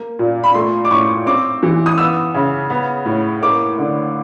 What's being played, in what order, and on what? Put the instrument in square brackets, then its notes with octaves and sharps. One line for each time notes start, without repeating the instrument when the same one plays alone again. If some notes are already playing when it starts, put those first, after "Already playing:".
Already playing: [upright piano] A#3
A#2
B5
A3 C6
D6
A2 C#6
C4 D6
E3
D#6
B3 E6
C#3
B3
A2
A#3 D6
D3